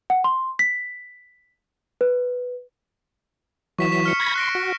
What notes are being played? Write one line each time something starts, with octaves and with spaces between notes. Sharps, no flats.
F#5
C6
B6
B4
E3 F#3 C#6 B6 E7
C#6 B6 E7
F6 C#7
B5 G#6 A#6
C6 F#6 A#6 D7
F#4